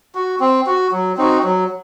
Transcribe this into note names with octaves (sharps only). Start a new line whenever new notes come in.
F#4
C4
F#4
F#3
C4 D#4 F#4
F#3